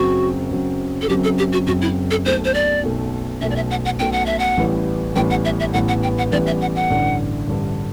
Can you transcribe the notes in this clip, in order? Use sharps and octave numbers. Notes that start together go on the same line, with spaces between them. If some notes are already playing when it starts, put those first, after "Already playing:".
Already playing: F#1 F#2 F#3 C4 F#4
F#1 F#2 F#3 C4
A4
F#1 F#2 F#3 C4 G4
A4
G4
F#4
F#1 F#2 F#3 C4 F#4
E4
A4
B1 B2 A3 C5
C5
D5
B1 B2 A3
B1 B2 A3 E5
D5
E5
F#5
F#5
B1 B2 A3 G5
F#5
E5
F#5
A1 A2 E3 G3 B3
A1 A2 E3 G3 B3 G5
F#5
E5
E5
A1 A2 E3 G3 B3 F#5
F#5
G5
F#5
A1 A2 E3 G3 B3 D5
E5
F#5
F#5
A1 G2 D3
A1 G2 D3